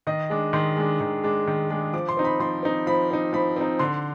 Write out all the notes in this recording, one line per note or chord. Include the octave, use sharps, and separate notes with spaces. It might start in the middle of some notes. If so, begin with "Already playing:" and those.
D#3 D#5
G#3 D4
D#3 C6
G#3 D4
D#3
G#3 D4
D#3
G#3 D4
F3 D6
C6
C4 D#4
B5
F3 C6
C4 D#4
F3 B5
C4 D#4
F3 B5
C4 D#4
D3 C6